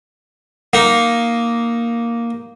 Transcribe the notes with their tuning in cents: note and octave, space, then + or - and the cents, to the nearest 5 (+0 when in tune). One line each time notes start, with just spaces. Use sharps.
A#3 +0 D#4 +0